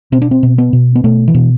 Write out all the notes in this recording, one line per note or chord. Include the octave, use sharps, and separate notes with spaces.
B2 C4
D4
C4
B2
B3
B2
B3
B2 A3
E3
B2